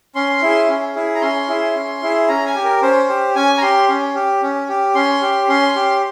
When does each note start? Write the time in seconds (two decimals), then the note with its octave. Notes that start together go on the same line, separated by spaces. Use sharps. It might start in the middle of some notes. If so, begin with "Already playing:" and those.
0.15 C#4 C6
0.42 E4 G#4
0.68 C#4
0.95 E4 G#4
1.15 A#5
1.21 C#4 C6
1.48 E4 G#4
1.75 C#4
2.02 E4 G#4
2.28 C#4 A#5
2.46 G#5
2.55 G4
2.64 A#4
2.82 C#4 C5
3.09 G4
3.35 C#4 G#5
3.58 A#5
3.62 G4 C6
3.89 C#4
4.15 G4
4.42 C#4
4.69 G4
4.95 C#4 C6
5.22 G4
5.48 C#4 C6
5.75 G4